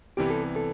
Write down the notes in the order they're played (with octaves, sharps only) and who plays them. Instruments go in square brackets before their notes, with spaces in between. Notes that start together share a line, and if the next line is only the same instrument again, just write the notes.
[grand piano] C2 C3 E3 B3 [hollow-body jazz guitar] G4
[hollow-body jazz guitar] A4
A4